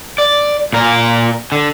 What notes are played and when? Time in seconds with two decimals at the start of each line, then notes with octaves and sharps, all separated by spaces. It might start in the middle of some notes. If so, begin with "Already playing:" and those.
0.18 D5
0.73 A#2 A#4
1.52 D3